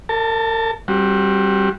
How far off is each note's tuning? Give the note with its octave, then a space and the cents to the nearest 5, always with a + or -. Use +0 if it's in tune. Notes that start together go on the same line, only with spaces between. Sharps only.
A#4 -40 A5 +10
G3 +0 C4 +40 F#4 -15